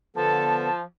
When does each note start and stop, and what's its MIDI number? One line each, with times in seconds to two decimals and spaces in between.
0.16 0.69 50
0.16 0.82 53
0.16 0.69 59
0.16 0.69 69
0.16 0.77 81